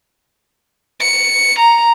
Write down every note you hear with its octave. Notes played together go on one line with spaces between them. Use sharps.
C#7
A#5